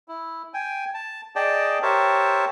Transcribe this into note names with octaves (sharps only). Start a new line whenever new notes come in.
E4
G5 G#5
A5
G#4 D5 D#5 G5 A5
G4 A#4 C5 C#5 E5 A5